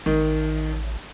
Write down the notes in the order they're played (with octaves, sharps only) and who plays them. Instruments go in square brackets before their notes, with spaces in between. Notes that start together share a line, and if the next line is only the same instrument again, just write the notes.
[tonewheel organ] A1 [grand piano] D#3